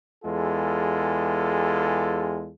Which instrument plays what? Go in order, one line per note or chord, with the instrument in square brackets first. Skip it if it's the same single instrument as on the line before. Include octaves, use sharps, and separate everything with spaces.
[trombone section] E2 G#3 F4 A4